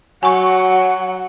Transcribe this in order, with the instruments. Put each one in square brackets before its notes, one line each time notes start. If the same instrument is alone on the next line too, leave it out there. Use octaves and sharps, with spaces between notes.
[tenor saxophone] F#3 [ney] F#5 [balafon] G#5 C#6